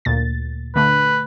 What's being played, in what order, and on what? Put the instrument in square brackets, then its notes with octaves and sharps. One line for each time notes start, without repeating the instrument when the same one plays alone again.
[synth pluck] D2 A#2 A6
[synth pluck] D3 A3 [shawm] B4